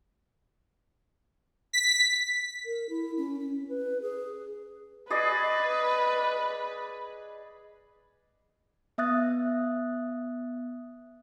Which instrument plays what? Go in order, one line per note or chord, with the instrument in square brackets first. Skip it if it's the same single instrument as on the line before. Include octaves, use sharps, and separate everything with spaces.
[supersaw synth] B6
[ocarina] A#4
E4
C#4
C#4
B4
G#4
[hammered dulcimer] G#4 D5 D#5 [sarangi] B4
[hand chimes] B3 E5 D#6 F#6 A6